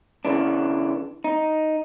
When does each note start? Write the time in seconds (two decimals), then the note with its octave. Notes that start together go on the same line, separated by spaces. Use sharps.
0.25 C#3 E3 D4
1.24 D#4